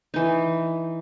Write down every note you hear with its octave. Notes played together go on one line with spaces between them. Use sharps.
E3 D#4